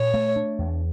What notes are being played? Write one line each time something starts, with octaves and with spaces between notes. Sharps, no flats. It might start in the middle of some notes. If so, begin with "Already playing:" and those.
Already playing: A#2 C#5
A3
D4
E2